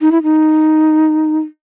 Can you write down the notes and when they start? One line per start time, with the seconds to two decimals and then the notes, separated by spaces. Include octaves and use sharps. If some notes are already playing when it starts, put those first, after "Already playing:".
0.01 D#4
0.12 E4
0.23 D#4